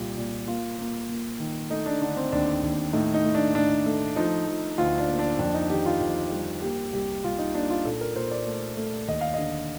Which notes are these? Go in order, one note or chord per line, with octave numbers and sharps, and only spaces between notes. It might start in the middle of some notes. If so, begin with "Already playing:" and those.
Already playing: C2 A#2 A#3 F4 G4
A#2
A#3 F4
A#3
A#3
D#3
A3 D#4
D4
D3 D4
C4
D#2 D4
D#2
A2 D#4
D#4
A2
D4
A2 D4
A3
F3 D#4
F3
D2 F4
D4
A#3
D4
F2 D4
D#4
D#3 G4
F4
F2
G3
A#3 G4
C2 G4
C2 F4
D#4
A#3 D4
F4
A#2 A4
A#4
A#2 C5
D5
A3
A3
D#2 D#5
F5
D3 D#5